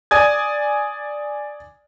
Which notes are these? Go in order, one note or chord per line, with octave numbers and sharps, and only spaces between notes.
D5 G#5 D#6 G#6